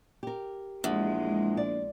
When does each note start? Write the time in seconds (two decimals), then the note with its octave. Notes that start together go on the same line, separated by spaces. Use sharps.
0.23 G4 A#4
0.84 A#1 E2 G#3
1.57 D5